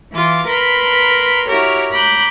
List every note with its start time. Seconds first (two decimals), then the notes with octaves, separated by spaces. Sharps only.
0.13 E3 F4 D6
0.47 A#4 B4 B5 C6
1.48 E4 F#4 G4 A#4 C#5
1.92 A#5 B5 D6 F#6 G6